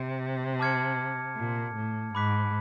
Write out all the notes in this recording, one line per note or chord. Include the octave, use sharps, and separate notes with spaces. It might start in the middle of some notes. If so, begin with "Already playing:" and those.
Already playing: C3
A5 D6 F6 G#6 C#7
A#2
A2
G#2 B5 D6 F#6 B6